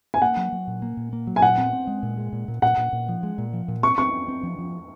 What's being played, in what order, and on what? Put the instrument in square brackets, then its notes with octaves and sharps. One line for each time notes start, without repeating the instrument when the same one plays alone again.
[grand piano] G#5
[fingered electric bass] A#3 [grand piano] F#5
[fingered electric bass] F#3
F#3
A#2
A#3
A#2
A#3
F#3
[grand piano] G#5
[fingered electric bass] A#2 [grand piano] F#5
[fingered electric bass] C4
C4
G#3
A#2
G#3
A#2
A#2
[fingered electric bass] A#2 [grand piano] F#5
[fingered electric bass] A#2
A#2
F3
G#3
A#2
F3
A#2
[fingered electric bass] C4 [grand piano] C#6
[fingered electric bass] C4 [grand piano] C#6
[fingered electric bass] C4
C4
F3
F3